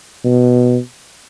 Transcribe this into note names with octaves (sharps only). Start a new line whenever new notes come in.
B2